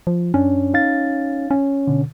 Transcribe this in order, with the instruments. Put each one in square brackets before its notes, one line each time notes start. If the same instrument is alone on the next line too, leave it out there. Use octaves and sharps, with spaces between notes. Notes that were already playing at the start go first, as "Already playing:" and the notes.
[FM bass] F3
[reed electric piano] F#2 D4 [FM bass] C#4
[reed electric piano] D#4 F5 A6
[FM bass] C#4
[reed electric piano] B2 D3